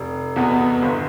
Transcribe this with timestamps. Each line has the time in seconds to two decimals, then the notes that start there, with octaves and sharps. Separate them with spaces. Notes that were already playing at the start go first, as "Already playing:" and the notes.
Already playing: F1
0.36 E2 B2 B3
0.82 G1